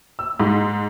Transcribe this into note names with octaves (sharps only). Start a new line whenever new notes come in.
E6
G#2